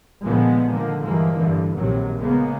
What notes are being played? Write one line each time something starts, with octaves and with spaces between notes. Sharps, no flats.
A#2 D3 D#3 F3 G#3 B3
D3 D#3 F3 A#3
G2 E3 F3 G#3 A#3
G2 D3 E3
A#1 C3 D#3 F#3
C#3 G#3 A#3 B3